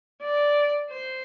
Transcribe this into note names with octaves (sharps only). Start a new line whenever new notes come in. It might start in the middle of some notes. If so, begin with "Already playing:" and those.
D5
C5